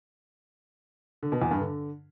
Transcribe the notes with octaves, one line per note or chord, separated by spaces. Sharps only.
D3
B2
E2
G2
D3